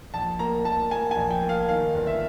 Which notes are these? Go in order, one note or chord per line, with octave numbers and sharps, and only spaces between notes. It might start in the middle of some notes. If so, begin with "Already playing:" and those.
A#1 A5
A#3 A#5
A#3 A5
A#3 G#5
G#5
A#1
G5
A#3
F5
D#3 F5
G1
E5